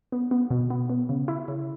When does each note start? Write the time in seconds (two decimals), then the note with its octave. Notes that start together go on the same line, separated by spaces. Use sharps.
0.12 B3
0.31 B3
0.50 B2
0.70 B3
0.90 B3
1.09 C#3
1.28 E4
1.48 C#3